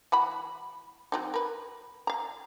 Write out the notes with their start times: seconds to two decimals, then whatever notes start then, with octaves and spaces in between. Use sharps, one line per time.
0.12 E3 F#4 B5
1.12 F#3 C4 D#4
1.34 A#4 B4
2.07 F5 A#5